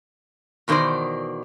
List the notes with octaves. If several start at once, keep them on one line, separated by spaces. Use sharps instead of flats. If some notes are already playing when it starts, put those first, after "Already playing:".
E2 B2 D#3 A#3 C5 D5